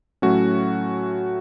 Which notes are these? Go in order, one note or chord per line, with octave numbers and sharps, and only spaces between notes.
A2 F#3 A3 C#4 F#4